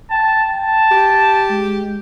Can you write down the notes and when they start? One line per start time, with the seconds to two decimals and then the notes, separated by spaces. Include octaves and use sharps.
0.10 G5 A5
0.57 A5
0.91 G4
1.49 G#3